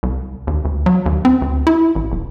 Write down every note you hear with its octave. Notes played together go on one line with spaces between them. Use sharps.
C2
D#2
D2
F#3
D#2
C4
D2
E4
A1
D#1